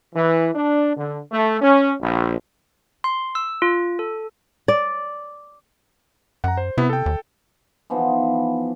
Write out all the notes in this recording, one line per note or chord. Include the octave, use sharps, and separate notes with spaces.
E3
D4
D3
A3
C#4
A#1
C6
E6
F4
A4
D5
F#2 F#5 A#5
C5
C3 B3 E4
A4 G5
D#2
E3 F3 B3 D#4